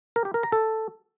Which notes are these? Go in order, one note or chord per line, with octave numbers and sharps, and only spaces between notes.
A#4
G4
A#4
A#5
A4